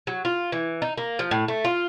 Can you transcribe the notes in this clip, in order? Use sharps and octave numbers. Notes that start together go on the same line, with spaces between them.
F#3
F4
E3
D#4
A#3
F3
A2
A3
F4